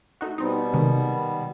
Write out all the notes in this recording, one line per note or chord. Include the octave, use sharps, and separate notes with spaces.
A3 D#4 F#4
B2 G3 B3 C4 D#4
C3 D#3 G#3